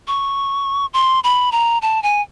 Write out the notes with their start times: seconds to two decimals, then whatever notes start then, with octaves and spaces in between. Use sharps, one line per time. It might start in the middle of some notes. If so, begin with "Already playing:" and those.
0.08 C#6
0.94 C6
1.24 B5
1.52 A#5
1.82 A5
2.03 G#5